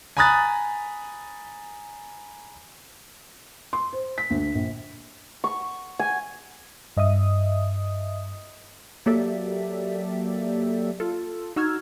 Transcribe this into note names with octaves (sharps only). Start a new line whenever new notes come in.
G#5 A#5 B5 D#6 F#6 A6
C6
C5
B6
D2
A#1
C#6
G#5
G2 D#5 E5 D#6
F#3 A#3 G4 A4 D5 E5
F4 A4
D#4 F#4 E6 F6 G#6